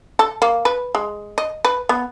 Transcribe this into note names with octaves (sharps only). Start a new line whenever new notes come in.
A4
A#3
B4
G#3
D#5
B4
B3